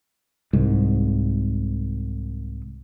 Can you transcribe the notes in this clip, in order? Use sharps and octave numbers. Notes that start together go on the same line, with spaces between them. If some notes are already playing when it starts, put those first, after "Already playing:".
C2 G#2